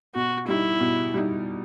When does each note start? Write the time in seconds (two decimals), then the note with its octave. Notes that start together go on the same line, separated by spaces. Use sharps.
0.15 B2 F#4
0.48 G3 D#4 E4
0.80 B2
1.14 G3 D#4